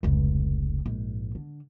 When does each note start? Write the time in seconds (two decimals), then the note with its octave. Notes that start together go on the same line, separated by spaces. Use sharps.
0.03 F1 C#2
0.86 A#1 G#2
1.35 D3